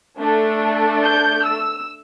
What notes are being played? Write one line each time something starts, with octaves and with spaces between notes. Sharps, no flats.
A3 D4 A4
G6
E6